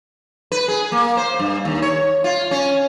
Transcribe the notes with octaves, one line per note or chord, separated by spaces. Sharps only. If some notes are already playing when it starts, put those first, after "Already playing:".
B4
G#4
A#3
C5
G2
D#2
C#5
F4
C#4